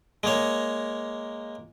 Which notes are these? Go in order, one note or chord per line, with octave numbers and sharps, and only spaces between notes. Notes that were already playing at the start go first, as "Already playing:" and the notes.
G#3 A#3 C#5